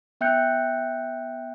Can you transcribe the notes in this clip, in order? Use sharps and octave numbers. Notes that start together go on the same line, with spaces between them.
B3 E5 G5 F#6 G6 C#7